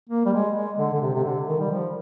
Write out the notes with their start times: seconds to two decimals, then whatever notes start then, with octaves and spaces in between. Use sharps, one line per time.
0.09 A#3
0.26 G3
0.33 G#3
0.55 G#3
0.79 D3
0.93 D3
1.02 C3
1.14 C3
1.24 D3
1.47 D#3
1.60 G3
1.70 F3